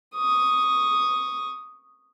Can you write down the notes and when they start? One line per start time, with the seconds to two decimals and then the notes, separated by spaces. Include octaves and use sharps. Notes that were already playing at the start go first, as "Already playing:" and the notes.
0.15 C#6 D#6